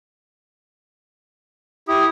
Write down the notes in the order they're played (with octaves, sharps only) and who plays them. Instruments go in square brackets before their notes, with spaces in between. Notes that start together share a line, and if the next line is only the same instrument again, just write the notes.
[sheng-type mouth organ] E4 G4 [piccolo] D#6